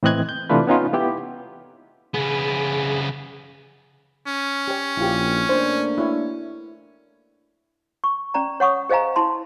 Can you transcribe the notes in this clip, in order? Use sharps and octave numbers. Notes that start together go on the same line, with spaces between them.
A2 E3 C4 D#5 F#6 G#6
G6
C3 E3 A3 D4 F4 B4
B3 C#4 D#4 F4
B3 E4 G4
C#3 B3 G#4
C#4
G4 C#5
A#1 E4 F4 G4
A3 A#3 D4 C5
E4 F#4 C#5
C#6
C#4 D5 A#5
C#5 F#5 C#6 D#6
G#4 C5 D#5 F5 G#5 A#5
E4 A5 C6